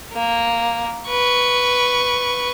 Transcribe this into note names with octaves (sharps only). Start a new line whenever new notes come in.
A#3
B4 C#6